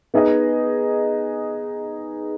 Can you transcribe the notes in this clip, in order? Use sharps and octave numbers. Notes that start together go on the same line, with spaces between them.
B3 D#4 G#4 D#5